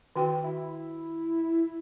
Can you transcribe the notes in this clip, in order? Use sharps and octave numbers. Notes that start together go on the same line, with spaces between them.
D#3 F#4 G5
E4